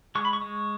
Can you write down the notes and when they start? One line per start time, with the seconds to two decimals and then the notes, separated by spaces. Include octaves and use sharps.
0.15 G#3 C#6
0.25 B5
0.33 C#6
0.42 G#3